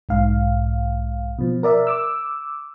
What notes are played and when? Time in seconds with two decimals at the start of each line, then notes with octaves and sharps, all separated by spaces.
0.09 B1 G#2 F5
1.38 B2 F3
1.63 A#4 D5 E5
1.87 D6 E6